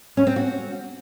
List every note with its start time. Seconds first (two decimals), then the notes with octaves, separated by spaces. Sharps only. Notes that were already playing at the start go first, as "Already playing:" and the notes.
0.17 C#4
0.27 C4
0.36 F#4